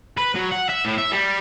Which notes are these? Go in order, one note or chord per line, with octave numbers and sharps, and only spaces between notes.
B4
F#3
F#5
E5
A2
E5
G3